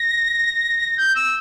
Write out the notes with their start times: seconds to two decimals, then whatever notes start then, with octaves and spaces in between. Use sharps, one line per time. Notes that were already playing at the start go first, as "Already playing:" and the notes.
Already playing: A#6
0.97 G6
1.15 E6